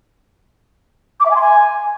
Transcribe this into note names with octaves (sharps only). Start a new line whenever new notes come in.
D6
E5
G#5
C6
G#5